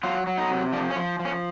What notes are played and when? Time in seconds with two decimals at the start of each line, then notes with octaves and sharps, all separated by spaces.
0.03 F#3 F4
0.27 F#3
0.38 D#4
0.50 C3
0.73 F3 D4
0.90 C#4
0.96 F3
1.19 F3
1.25 C#4